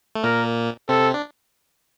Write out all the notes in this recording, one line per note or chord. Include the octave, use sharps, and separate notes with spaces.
A3
A#2 A#3 A#4
C3 C4 A4
D4